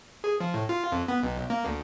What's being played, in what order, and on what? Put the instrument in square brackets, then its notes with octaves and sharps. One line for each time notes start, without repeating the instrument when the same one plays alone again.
[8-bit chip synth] G#4
F3
A2
F4
F2
B3
B1
A#3
D2